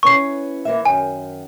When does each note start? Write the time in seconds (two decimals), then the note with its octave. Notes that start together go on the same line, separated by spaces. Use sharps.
0.03 E3 C#4 C#6 C7
0.65 E3 A#3 E5
0.85 F#2 D#3 G#5